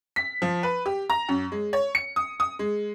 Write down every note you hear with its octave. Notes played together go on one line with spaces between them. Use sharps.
B6
F3
B4
G4
A#5
F#2
G#3
C#5
C#7
D#6
D#6
G#3